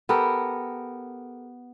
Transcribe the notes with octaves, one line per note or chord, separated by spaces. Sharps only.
B3 G4 A4 A#4